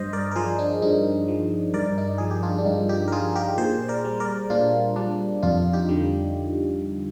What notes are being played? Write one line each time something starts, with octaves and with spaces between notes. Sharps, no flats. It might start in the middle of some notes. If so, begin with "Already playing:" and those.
Already playing: G2 C5 D#5
A#4 D5
A#4
F3 G#4 C5
D4
G2 D#4
F3
G2 A#4 D5
D#4
F3 G#4
G4
D4 F4
D4
G2 D#4
D#4 G4
A#4
F3 F4 G#4
G4 A#4
A#2 G#4 C5
A#4 D5
G3
A#4 D5
A#2 D4 F4
G3 D4
F2 D4 F4
D#4 G4
D3 G3